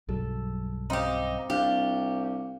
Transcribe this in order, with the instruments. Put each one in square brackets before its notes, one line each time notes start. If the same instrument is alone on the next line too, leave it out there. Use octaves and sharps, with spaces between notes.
[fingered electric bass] B1 G2 F#3 [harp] A4
[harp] C4 F5 [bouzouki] D#4 G4
[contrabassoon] C2 [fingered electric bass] D4 [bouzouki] G4 [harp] F5 F#6 A6